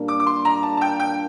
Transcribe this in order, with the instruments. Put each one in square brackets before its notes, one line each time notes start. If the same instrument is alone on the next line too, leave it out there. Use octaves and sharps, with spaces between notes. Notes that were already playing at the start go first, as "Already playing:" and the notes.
Already playing: [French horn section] A#2 G3 A#3 D4
[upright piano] D6
D6
C6
A#5
A5
A5
G5
G5